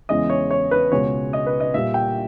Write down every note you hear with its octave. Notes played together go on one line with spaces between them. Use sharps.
E2 C#3 E3 G#3 D#5
C#5
C#5
B4
C#2 B2 G#3 C#5
D#5
B4
D#5
A#2 G3 E5
G5